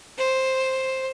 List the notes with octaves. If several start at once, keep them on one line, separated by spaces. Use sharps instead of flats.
C5